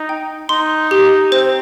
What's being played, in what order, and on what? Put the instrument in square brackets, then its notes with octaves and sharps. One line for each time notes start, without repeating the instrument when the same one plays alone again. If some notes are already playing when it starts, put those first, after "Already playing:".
Already playing: [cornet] D#4
[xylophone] G5
[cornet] D#4 [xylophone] C6
[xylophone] G4
[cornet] C4 [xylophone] C5